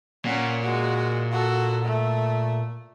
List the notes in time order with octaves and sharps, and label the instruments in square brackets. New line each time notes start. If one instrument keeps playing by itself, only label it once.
[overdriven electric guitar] A#2 [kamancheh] C#4 F#5
[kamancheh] G#3 F#4
F#4 A4
A3